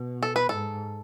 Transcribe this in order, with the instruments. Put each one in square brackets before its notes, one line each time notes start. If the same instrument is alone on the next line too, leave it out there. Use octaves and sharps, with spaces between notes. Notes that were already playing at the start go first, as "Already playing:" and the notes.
Already playing: [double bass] B2
[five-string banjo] A4
B4
[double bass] G#2 [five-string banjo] A4